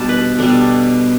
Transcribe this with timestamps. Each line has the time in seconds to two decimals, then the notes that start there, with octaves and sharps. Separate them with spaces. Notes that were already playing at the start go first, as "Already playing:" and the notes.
Already playing: B2 G3 B3 D4 A5
0.09 B4
0.39 B2 G3 B3 D4 A4